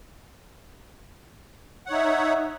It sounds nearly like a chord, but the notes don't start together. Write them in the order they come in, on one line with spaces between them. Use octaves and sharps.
F#5 C#5 D#4 E5